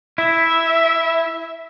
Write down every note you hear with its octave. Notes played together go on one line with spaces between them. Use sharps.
E4 E5